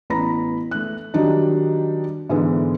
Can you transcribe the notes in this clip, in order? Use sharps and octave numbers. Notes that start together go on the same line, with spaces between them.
A1 B3 A#5 B5 A#6
A3 F#6
D#3 F#3 G3 D4 D#4
G#2 D3 E3 G#3 B3 E4